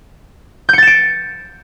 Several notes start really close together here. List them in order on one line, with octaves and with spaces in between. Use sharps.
G6 C#7 A6 E7 D7